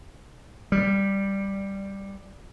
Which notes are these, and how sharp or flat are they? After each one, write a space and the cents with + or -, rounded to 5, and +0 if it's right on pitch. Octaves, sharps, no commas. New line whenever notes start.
G3 +5